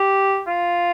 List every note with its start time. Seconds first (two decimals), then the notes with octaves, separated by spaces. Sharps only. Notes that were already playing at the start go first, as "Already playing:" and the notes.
Already playing: G4
0.48 F4